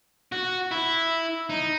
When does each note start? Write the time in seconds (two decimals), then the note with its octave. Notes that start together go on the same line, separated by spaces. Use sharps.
0.32 F#4
0.72 E4
1.50 D#4